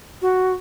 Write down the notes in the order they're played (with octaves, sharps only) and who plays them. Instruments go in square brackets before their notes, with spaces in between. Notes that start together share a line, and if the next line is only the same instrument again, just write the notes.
[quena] F#4